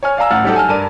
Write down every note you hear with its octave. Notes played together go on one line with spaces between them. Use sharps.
C#5 G#5 F6
D5 F5 G#5 A#5 E6
A1 F#5 F6 A6
F#3 G3 D#4 G4 A4 F#5
G#5 A5 F6
G2 A#4 D5 D#7